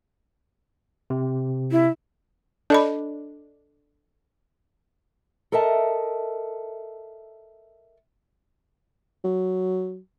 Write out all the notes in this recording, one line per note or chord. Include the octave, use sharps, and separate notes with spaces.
C3
E4
D4 A4 D#5 B5
A4 A#4 D#5 E5 A5
F#3